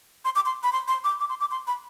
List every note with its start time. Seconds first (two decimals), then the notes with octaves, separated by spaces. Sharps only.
0.25 C6
0.35 D6
0.46 C6
0.63 B5
0.73 C6
0.88 C6
1.04 D6
1.20 D6
1.29 C6
1.40 D6
1.51 C6
1.67 B5